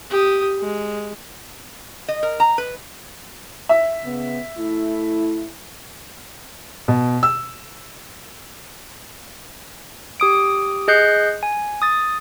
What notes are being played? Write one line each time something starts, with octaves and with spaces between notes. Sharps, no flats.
G4 D#6
G#3
D#5
A#4
A#5
B4
E5
C#3 B3
A3 E4
B2
E6
G4 D#6 D7
G#4 D#5 F#6 G6 C7 C#7
G#5
D#6 A6